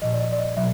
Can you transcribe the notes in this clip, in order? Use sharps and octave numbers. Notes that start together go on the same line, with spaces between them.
A#2 F3 D#5
D5
D#5
D5
D#5
B2 F#3 E5